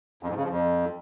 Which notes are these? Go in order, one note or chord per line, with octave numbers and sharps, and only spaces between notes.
F2
G#2
C#3
F3
F2